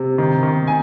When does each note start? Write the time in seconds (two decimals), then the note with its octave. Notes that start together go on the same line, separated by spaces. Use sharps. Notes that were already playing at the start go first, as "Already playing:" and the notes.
Already playing: C3
0.18 D#3
0.43 D#3
0.67 G#5